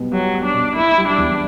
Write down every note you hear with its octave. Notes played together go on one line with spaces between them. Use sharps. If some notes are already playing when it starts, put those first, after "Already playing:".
Already playing: B2 G3 B3
F#3 G3
B3
D4
B2
A#3 E4
G3
D4
E2